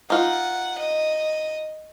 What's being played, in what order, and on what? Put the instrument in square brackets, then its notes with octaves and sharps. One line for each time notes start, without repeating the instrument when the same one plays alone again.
[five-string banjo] D#4 F4 [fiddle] F#5
[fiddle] D#5